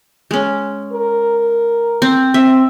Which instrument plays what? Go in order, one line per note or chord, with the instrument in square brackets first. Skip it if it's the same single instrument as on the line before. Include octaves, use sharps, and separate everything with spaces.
[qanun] G#3 C#4
[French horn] A#4
[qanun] C4
[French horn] C4 [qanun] E5